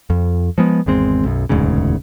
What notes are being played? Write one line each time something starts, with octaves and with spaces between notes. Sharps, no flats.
F2
F3 G#3 B3
G#1 E2 G#3 C4
B1 F#2
E1 D2 G#2 C#3